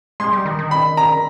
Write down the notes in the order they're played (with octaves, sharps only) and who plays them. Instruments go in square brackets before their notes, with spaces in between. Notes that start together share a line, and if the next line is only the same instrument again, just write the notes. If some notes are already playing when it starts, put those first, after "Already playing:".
[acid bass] G#3 [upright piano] C6
[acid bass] G3
D#3
D#3
[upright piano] B5
A#5